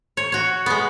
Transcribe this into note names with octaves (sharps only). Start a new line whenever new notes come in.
C#5
F#4 C#5
G#3 B3